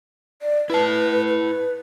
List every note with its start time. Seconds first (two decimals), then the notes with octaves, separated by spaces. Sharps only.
0.42 D5
0.70 E4 B4 A5
1.28 B4